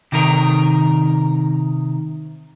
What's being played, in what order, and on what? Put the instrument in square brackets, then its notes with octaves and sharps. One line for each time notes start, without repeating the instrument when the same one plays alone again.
[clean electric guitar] C3 D#3 A#4